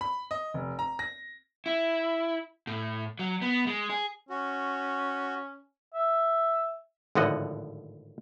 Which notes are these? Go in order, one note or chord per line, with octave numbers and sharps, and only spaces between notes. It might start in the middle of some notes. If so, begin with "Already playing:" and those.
B5
D#5
F1
A#5
A#6
E4
A2
F#3
B3
G#3
G#4
C#4 F#4
E5
G#1 A2 D3 F3 D#5 F#5